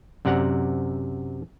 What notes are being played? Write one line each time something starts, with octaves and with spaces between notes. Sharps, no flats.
F#2 C3 D5 F#5 A#5